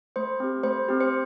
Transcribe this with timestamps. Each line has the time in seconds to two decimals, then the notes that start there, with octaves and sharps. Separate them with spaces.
0.16 A3 C5
0.40 C4 G4
0.63 A3 C5
0.88 C4 G4
1.00 C5